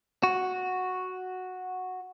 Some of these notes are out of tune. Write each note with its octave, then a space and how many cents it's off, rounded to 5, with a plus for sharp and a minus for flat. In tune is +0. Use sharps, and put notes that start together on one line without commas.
F#4 -5